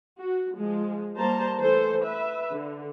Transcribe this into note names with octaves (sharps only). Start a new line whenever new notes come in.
F#4
F3 G#3
G3 A#3 C5 A5 A#5
E3 A3 A4 C5
B4 E5
D3